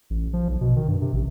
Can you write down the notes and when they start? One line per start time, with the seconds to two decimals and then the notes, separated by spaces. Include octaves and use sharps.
0.10 A1
0.33 F3
0.48 B1
0.61 B2
0.76 D#3
0.88 G2
1.01 C3
1.13 A1